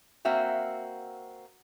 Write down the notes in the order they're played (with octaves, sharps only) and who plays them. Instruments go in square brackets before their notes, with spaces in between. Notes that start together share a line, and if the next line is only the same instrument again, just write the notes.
[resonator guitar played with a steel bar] A#3 C4 F#4 E5